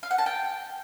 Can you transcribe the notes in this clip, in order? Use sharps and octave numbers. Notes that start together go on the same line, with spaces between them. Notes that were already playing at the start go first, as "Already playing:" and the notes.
F5
F#5
A5
G5